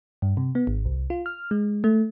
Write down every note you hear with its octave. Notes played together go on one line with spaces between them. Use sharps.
G2
C3
B3
G#1
C2
F4
F6
G#3
A3